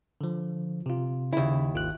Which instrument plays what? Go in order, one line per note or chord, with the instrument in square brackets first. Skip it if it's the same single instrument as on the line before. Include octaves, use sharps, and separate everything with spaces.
[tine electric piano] D3 F3
C3 F4
[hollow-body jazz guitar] D#2 E4 [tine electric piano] C#3
[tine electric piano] G#1 F4 F#6